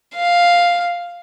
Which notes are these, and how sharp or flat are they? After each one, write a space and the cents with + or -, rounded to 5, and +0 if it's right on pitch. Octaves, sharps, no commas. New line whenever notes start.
F5 +0